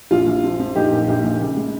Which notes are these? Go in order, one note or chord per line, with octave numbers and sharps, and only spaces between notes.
A#1 F4
A#1
F3
F3
A#1 D#4 G4
A#2
A#1
A#1
C#3
G#3